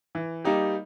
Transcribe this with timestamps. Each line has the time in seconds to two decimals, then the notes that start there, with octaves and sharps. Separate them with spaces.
0.15 E3
0.45 G3 A#3 D#4 G4